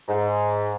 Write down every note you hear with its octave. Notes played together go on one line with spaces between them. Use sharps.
G#2